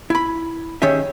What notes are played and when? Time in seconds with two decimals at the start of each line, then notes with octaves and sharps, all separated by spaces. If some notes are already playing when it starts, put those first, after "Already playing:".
0.10 E4 B5
0.82 D#3 C#4 G4 G#4 E5